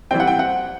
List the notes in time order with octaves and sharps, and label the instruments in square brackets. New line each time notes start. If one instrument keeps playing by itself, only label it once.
[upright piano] E3 G3 C4 G5
F#5
G5
F#5